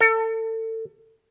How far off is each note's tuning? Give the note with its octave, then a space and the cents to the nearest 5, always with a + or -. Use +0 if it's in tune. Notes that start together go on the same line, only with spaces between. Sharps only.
A4 +30